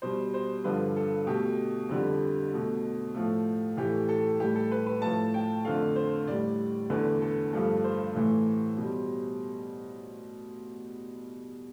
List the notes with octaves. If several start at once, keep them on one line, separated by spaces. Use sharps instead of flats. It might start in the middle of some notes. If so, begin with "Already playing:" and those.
B2 G3 C5
C5
G2 D3 F3 B4
A4
B2 A3 G4
F2 D3 G3
B2 A3
A2 F3 A3
A2 E3 A3 G4
A4
A2 G3 G4
A4
B4
B4
A2 F3 A3 A5
G5
F2 D3 A3 F5
C5
A2 G3 D5
E2 D3 A3 B4
A4
G2 F3 A3 A4
C5
A2 E3 A3
B2 G3